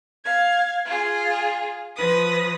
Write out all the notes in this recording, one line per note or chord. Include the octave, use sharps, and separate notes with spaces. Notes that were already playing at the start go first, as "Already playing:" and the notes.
F5 G#6
F4 G#4
F3 B4 D#6